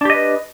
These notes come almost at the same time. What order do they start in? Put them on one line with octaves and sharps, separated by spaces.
D4 G4 D#5 B4